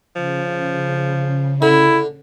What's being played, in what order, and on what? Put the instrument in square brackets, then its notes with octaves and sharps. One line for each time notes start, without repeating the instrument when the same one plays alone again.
[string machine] C#3 [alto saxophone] F3
[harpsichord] D3 [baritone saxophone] E4